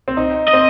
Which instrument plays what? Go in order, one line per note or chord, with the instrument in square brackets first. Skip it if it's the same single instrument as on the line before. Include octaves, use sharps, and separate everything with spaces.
[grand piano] C4
D#4
[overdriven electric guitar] D#5
[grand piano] C4